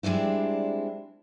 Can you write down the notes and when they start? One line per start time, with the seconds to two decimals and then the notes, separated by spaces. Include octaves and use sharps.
0.03 G3 G#3 C4 D4 E4